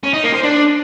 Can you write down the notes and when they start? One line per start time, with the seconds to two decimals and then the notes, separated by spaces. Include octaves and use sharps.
0.04 C#4
0.13 D#4
0.23 A#3
0.33 C5
0.43 D4